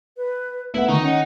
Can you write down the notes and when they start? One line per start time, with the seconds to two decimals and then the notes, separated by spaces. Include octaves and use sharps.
0.17 B4
0.74 A3 B3 E4 E5 F#5
0.89 D#3 D#4 C#6
1.02 C#4 F#5